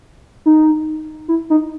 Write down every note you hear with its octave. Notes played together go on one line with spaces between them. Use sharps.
D#4
E4
D#4